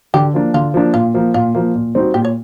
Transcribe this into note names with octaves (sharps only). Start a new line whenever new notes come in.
D3 G4
F3 A#3 D4
D3 F4
F3 A#3 D4
A#2 F4
F3 A#3
A#2 F4
F3 A#3
A#2
G3 C4 D#4 F#4
A#2 G4
C#5